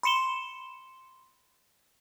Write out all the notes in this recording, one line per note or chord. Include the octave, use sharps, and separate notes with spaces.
B5 C6 C#7 E7 G7